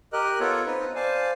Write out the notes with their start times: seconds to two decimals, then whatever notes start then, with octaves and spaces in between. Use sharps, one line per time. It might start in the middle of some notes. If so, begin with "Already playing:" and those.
0.13 G4 A#4 D#5 F#6
0.40 B3 F4 A4 C#5
0.66 C4 D#4 B4
0.95 C5 D5 F5 G#5 A5